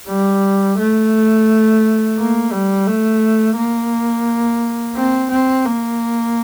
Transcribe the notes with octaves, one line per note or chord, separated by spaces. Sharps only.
G3
A3
A#3
G3
A3
A#3
C4
C4
A#3